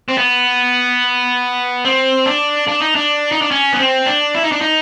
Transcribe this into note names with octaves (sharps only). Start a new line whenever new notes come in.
C4
B3
C4
D4
D4
D#4
D4
D#4
D4
C#4
B3
C4
D4
E4
D#4
D4
D#4